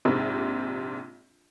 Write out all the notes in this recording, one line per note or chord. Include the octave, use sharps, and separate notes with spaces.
A#1 G#2 C3